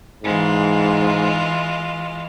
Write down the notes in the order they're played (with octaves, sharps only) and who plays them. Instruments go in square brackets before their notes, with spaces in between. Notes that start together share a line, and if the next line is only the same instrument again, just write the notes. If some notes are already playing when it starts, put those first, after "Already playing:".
[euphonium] G#2 [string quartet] E3 G#3 F4